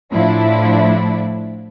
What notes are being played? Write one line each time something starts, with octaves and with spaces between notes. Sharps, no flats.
A2 F3 D4 E4